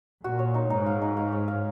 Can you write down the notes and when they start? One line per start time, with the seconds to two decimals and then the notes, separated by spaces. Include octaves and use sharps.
0.24 A#2 F#4
0.39 C#5
0.54 D#4
0.70 G#2 D#4
0.86 F5
1.02 D#4
1.17 F5
1.32 C#5
1.48 F5